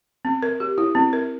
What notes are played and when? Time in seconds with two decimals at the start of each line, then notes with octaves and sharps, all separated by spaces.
0.25 C4
0.43 A#4
0.60 G4
0.78 E4
0.95 C4
1.13 A#4